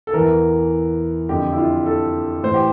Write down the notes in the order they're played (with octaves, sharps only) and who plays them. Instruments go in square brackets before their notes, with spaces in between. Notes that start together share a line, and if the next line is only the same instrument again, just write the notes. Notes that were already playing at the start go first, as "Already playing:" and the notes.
[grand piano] A4
E2 E3 A#4
F2 D3 G4
E4
F4
A4
A2 E3 C5
G4